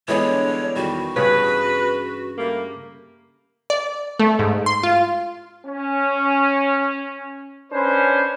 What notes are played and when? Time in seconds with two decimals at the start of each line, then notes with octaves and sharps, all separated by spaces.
0.08 D3 E3 G3 G#3 B3 D4 C#5
0.76 E2 D#3 G3 F#4
1.16 G2 C#3 G#4 B4
2.37 G3 A3 A#3
3.70 D5
4.20 A3
4.39 G#2
4.66 C6
4.83 F4
5.66 C#4
7.72 C#4 D4 B4 C5